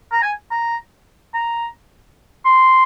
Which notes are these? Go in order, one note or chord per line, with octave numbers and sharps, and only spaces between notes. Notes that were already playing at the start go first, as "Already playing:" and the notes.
A#5
G#5
A#5
A#5
C6